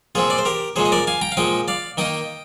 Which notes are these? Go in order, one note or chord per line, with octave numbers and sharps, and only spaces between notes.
A#2 F3 C4 F4 G#4
D5
C5
G4 A#4
A#2 F3 G#3 G#4 C5
D#5
A#4 D5
F5 G#5
G5 A#5
F5
A#2 F3 G#3 D#5 G5
D5 F5
D#3 A#3 D#4 D#5 G5